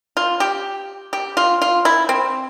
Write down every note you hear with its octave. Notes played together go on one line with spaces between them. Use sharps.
F4
G4
G4
F4
F4
E4
C4